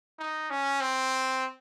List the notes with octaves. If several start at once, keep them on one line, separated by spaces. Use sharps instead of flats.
D#4
C#4
C4